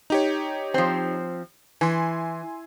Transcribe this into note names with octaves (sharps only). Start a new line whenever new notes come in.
D#4 G4 C#5
F3 C4
E3 G#5 C6